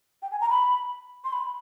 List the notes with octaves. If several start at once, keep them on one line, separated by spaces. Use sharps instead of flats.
G5
G#5
A#5
B5
C6
B5